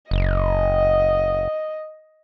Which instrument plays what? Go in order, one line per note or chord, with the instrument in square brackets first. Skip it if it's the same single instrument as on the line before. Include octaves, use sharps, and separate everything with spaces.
[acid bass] F#1 [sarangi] D#5